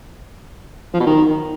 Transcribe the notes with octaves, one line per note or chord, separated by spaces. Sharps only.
F3
B2
D#3